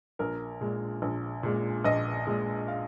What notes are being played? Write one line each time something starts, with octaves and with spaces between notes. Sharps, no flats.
A#1 A#4
A#2 G#3
A#1
A#2 G#3
A#1 D#5
A#2 G#3
F5